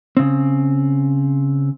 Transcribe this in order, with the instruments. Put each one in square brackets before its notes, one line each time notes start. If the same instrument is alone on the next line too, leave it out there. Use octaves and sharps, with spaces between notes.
[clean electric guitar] C#3 C4